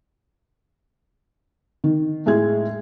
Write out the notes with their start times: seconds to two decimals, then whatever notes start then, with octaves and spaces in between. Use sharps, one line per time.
1.84 D#3
2.26 A2 G#3 G#4 G#6